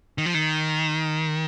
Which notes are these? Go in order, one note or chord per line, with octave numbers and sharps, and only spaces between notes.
D#3
F3
D#3